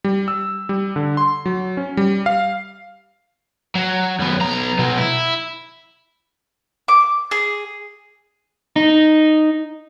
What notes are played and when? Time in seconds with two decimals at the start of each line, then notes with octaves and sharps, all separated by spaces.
0.04 G3
0.28 E6
0.69 G3
0.96 D3
1.17 C6
1.46 F#3
1.77 C#4
1.97 G3
2.26 F5
3.75 F#3
4.19 F#2 B3
4.41 B1 A#5
4.79 B2 F#3
4.98 E4
6.88 D6
7.31 G#4
8.76 D#4